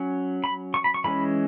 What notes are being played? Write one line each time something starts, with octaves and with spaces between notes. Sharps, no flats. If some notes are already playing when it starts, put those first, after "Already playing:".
Already playing: F#3 C#4
B5
C#6
B5
C#6
E3 G#3 C#4 B5